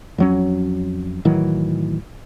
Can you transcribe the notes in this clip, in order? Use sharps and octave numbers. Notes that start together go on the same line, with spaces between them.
F2 F#3 C#4
A2 D#3 E3 F#3